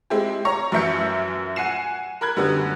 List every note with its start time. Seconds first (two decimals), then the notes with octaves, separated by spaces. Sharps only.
0.10 G#3 C4 E4 G4
0.45 C#5 A#5 C#6
0.72 F#2 E3 F3 E5 G6 C#7
1.56 F#5 G#5 C7 E7
2.21 A#4 B5 F#6 G#6
2.36 F#2 D3 G3 B3